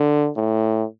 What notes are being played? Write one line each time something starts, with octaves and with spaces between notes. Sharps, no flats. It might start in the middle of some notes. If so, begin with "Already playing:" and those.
Already playing: D3
A2